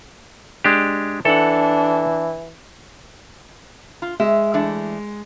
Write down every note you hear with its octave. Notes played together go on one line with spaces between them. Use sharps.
G#3 D4 G4
E3 D4 A4 F#5
F4
G#3 E5
E3 A3 D4